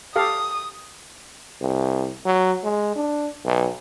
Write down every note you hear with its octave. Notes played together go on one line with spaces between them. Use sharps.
G4 A4 F5 D#6
C2
F#3
G#3
D4
B1